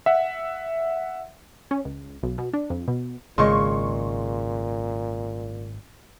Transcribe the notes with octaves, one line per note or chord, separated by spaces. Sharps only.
E5 F#5
C#4
C#2
B1
B2
D4
F2
B2
G#1 A#2 C#3 G#3 C6 C#6